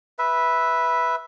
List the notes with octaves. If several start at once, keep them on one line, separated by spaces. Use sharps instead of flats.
B4 E5